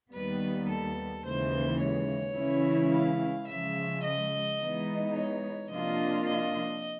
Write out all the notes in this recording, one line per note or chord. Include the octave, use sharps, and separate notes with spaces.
D#2 D#3 G3 B3 B4
A4
D#2 C#3 E3 G#3 C5
C#5
C#3 E3 G#3 C#4 E4
F5
C#3 F3 G#3 E5
D#5
E3 G#3 B3 D#4
C#5
C3 F3 A#3 D4 F4 D#5
D#5